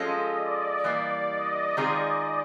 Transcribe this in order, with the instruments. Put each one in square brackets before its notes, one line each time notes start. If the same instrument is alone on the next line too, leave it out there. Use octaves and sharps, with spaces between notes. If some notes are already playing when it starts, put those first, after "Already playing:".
Already playing: [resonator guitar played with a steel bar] F3 G#3 C#4 F4 A4 [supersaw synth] D#5
[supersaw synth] D5
[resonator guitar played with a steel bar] E3 G3 A#3 [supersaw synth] D5
[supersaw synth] D#5
[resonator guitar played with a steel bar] D#3 G#3 C4 F4 G#4